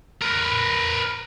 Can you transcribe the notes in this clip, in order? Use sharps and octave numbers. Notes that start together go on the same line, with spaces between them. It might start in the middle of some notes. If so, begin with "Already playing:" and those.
A#4 B4